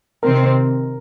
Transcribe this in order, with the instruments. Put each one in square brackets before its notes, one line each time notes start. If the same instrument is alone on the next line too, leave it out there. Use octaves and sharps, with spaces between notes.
[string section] C3 D#3 C4 [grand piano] A#4